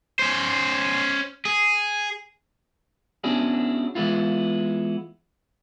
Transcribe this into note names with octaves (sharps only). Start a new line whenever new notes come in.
C#4 C5
G#4
B3 C#4 D4 E4 F#4 G#4
E3 G#3 B3 E4 F4